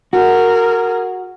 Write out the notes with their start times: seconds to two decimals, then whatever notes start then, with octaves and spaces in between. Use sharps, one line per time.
0.13 F#4 G#4 A#4